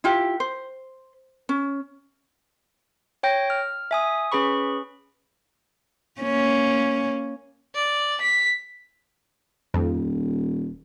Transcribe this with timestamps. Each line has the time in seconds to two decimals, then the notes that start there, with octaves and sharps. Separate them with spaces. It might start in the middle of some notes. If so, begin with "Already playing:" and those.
0.04 E4 F4 G4
0.40 C5
1.49 C#4
3.23 C#5 G5 G6 A#6
3.50 F6
3.91 E5 G#5 D#6
4.32 C#4 G#4 B4 B5 C#6
6.21 A#3 C#4
7.75 D5
8.21 B6
9.74 D#1 F2